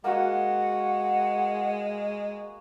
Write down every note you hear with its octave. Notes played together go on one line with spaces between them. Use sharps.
G#3 A#3 F#4 F#5